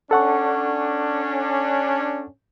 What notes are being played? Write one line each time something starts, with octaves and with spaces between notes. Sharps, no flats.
C#4 D4 A4 F#5 C#6